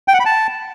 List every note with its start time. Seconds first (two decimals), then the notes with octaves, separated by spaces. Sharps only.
0.08 G5
0.14 F#5
0.20 B5
0.26 A5